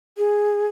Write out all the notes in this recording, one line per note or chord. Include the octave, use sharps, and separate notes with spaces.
G#4